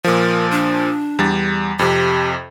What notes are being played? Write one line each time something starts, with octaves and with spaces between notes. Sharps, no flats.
A#2 F3 A#4
D4
E2 G3 A6
F2 C3 G4